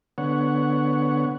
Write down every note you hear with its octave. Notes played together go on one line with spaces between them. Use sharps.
D3 B3 C#5 F#5